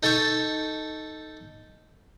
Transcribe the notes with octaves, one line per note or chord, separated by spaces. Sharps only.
D#4 A4 G5 A5 C#6